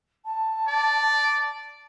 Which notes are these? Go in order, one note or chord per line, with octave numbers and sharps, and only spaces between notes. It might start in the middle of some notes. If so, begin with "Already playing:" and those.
A5
D5